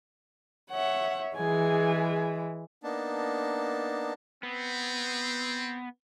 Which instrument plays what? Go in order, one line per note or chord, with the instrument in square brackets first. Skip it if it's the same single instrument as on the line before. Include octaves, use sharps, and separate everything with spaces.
[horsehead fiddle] C#5 E5 [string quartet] F#5
[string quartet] E3 G#3 [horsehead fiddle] G#4 G#5
[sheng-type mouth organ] A#3 B3 D4 D#4 A5
[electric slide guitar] B3 [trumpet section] C4